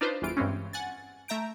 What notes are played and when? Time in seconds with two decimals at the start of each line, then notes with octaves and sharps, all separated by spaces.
0.01 D4 D#4 F4 B4 C5
0.22 G1 E2 E3 F4 D7
0.37 G2 E3 G#3 C4 C#4
0.73 F#5 G#5 A6
1.28 A3 E5 A#5 G6 D7